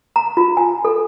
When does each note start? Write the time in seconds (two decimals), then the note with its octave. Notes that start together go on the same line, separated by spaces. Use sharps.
0.16 A#5
0.37 F4
0.57 G#5
0.85 A4